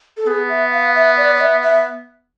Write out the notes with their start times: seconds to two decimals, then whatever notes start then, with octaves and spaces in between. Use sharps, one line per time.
0.17 A4
0.27 B3 G#4
0.49 E5
0.72 F5
0.95 E5
1.17 D5
1.35 D5
1.41 E5
1.63 E5